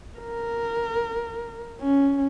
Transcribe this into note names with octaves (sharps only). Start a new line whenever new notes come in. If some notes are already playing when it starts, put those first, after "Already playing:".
A#4
C#4